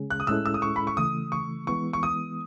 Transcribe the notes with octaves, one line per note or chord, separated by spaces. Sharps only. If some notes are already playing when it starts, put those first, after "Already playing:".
Already playing: C#3 G#3 C#4 G#4
F#6
D#6
A2 G#3 C#4 E4 A4 E6
E6
D#6
C#6
B5
C#6
C#3 E3 A3 D#6
C#6
E3 G#3 B3 E4 C#6
C#6
D#6